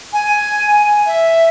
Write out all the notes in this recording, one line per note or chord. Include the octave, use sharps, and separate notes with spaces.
G#5
E5